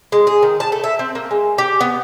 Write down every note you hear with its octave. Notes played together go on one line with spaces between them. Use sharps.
G#3
G#4
D#3
A5
A3
E5
C4
A#3
G#3
G4
B3